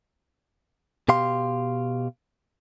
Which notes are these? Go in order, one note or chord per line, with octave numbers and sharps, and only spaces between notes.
B2 G4 F5 C6